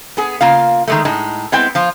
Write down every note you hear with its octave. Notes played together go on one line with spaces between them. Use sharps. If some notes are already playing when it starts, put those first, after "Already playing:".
B3 G#4
C#3 A#3 F4 F5
D#3 G#3 A3
A2 G#3 D#4
G#3 B3 C4 E4 G5
F3 F4